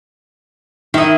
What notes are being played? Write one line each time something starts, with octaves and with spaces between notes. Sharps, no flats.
D#3 E4 D#5